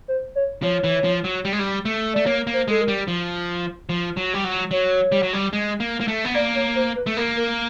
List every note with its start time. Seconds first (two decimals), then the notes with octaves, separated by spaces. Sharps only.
0.08 C5
0.35 C#5
0.63 F3 C#5
0.84 E3
1.04 F3
1.24 F#3
1.45 G3
1.53 G#3
1.59 G3
1.85 A3
2.14 A3 D5
2.26 A#3 C#5
2.47 A#3
2.53 C5
2.68 G#3 A4
2.81 A#4
2.88 G3
3.08 F3
3.89 F3
4.17 F#3
4.34 G3
4.44 F#3
4.71 F#3 C#5
5.12 G3
5.23 F#3
5.33 G3
5.53 G#3
5.80 A#3
6.01 A#3
6.08 A3
6.25 B3
6.34 A#3 D5
6.55 C#5
6.76 C5
6.96 B4
7.07 A3
7.17 A#3 A#4
7.37 A#4